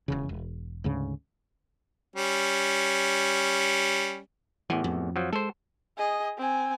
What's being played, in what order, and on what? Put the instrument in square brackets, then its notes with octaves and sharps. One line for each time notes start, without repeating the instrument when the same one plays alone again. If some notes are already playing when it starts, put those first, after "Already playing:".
[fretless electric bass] E1 E2 C#3
E1
D2 G#2 C#3
[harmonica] G3 C#4
[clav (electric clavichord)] A1 E2 [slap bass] E3
[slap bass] F2
[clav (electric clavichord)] F3 F#3
[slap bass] G#3 [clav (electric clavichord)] A4 C5
[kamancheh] G#4 D#5
C4 G#5